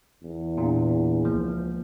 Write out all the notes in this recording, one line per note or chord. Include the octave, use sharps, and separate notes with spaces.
E2
A#2 D4
C#2 F3 A#3